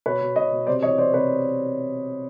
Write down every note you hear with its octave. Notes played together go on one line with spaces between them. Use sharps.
B2 B4 C#5
B2
B2 C#5 D#5
B2
C3 C5 D5
E3 C#5 D#5
E3 C5 D5
C3 B4 C#5